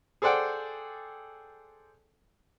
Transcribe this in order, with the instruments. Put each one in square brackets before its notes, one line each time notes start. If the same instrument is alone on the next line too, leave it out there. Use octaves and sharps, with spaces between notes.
[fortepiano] G#4 A4 C5 D5 F#5 G5